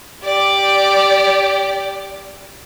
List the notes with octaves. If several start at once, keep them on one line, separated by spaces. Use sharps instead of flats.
G4 D5